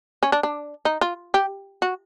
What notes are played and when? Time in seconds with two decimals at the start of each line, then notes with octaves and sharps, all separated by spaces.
0.23 C#4
0.32 D4
0.43 D4
0.85 D#4
1.01 F4
1.34 G4
1.82 F#4